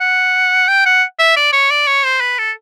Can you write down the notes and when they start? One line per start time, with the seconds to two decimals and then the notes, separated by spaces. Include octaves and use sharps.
0.01 F#5
0.68 G5
0.85 F#5
1.19 E5
1.36 D5
1.53 C#5
1.70 D5
1.87 C#5
2.04 C5
2.21 B4
2.39 A4